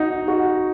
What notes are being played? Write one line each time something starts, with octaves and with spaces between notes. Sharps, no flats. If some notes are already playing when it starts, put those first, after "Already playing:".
Already playing: D#4 F#4
F#4